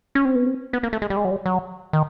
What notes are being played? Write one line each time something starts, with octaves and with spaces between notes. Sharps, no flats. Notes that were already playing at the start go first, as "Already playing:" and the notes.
C#4
C4
B3
C4
B3
A#3
A3
G#3
G3
G#3
F#3
G3
F#3
D#3